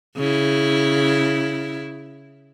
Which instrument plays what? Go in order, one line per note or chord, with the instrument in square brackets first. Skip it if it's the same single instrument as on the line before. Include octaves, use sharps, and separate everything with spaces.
[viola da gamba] C#3 E4